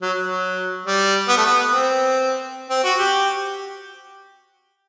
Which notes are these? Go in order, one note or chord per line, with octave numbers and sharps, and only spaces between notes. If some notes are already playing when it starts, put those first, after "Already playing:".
F#3
F#3
G3
B3
A3
B3
C4
C4
F#4
G4